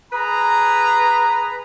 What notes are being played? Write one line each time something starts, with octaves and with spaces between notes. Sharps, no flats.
G#4 B4 A#5